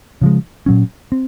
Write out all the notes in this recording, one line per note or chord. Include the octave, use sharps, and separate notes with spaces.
C#3 F3 G#3
A#2 F#3 C#4
C4